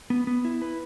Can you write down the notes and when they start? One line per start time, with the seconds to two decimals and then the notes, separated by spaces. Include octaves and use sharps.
0.10 B3
0.27 B3
0.45 E4
0.62 B4